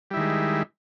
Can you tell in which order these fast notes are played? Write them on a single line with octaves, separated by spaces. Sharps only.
G3 E4 D#3 G#3